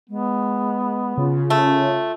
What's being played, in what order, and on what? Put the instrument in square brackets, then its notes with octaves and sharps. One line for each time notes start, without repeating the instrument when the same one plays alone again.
[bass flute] G#3 [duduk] B3
[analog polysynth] C#3 [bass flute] F4
[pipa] A3